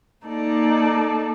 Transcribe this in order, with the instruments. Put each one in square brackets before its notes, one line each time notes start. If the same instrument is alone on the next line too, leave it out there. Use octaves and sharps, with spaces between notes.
[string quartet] A#3 D#4 A4 D5